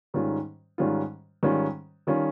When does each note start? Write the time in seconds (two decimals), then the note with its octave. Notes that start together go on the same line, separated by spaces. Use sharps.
0.14 G#2 D#3 G3 C#4 F4
0.78 G#2 D#3 G3 C#4 F4
1.43 G#2 D#3 G3 C#4 F4
2.07 D#3 G3 C#4 F4